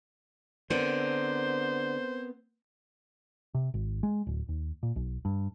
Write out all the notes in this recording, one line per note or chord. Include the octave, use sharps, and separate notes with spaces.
D3 B3 C4 A#4 C5
C3
G#1
G#3
D1
D#2
A#2
B1
G2